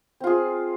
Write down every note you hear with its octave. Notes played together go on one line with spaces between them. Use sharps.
C4 F4 G#4